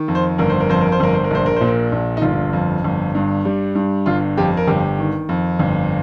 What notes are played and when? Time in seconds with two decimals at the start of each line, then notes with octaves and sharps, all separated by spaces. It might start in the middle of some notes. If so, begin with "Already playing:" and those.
Already playing: D#3
0.08 F2
0.15 C5
0.38 G1 A#4
0.50 C5
0.60 A#4
0.69 F2 C5
0.81 A#4
0.92 C5
1.00 G1 A#4
1.14 C5
1.24 A#4
1.31 A#1 C5
1.46 A#4
1.56 A#2 C5
1.67 A#4
1.92 A#1
2.17 D#4
2.22 G1 F4
2.53 F2
2.84 G1
3.15 G2
3.45 G3
3.75 G2
4.06 G1 F4
4.37 F2 G4
4.57 A#4
4.68 G1 G4
4.98 D#3
5.29 F2
5.60 G1